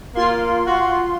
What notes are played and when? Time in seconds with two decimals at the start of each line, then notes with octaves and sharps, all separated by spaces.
0.15 A#3 F4 C6
0.67 F#4